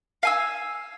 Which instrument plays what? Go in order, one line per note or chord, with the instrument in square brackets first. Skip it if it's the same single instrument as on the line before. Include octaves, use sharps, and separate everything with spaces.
[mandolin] F5 G#5 E6